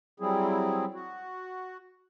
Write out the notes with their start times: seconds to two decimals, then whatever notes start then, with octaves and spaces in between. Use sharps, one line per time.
0.20 F#3 G3 C4 E4 G#4
0.94 F#4